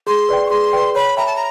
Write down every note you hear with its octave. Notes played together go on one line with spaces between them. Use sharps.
G#4 C6
B4 D5 G5
C#6
G#4 C6
B4 D5 G5
C#5 B5
E5 G5 A#5 B5
A5
A#5